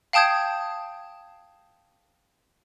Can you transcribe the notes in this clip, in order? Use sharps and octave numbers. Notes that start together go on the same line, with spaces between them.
F5 G5 A5 D#6 G6 G#6